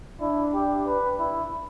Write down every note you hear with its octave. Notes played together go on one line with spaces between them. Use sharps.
D4 E4
G4
B4
E4